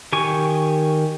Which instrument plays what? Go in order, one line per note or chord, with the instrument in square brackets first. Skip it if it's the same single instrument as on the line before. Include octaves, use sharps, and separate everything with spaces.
[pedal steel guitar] D#3 G4 G#5 C#6